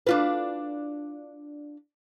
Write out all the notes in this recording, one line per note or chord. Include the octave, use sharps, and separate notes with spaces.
D4 F4 B4